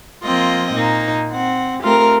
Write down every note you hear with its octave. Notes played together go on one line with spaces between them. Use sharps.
F3 A#3 C4 F4 D#5
A#2 A#3 D#4
C4 F#5
A3 C4 F4 G4 A#4